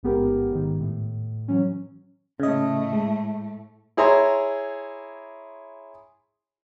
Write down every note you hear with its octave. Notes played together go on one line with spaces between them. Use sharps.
A1 G#2 B3 G4 A#4
G#2 D#3
A2
E3 F#3 C#4
A2 C#3 A3 D#5
G#3
E4 G#4 C#5 A#5 C6